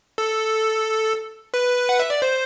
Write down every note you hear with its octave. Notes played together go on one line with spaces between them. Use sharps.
A4
B4
F#5
E5
D5
C5